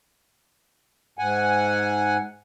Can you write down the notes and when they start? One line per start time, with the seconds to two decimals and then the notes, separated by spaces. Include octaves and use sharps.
1.19 G#2 F#5 G#5